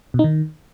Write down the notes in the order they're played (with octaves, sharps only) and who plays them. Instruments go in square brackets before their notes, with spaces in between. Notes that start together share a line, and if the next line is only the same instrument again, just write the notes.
[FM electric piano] B2
D#4
D#3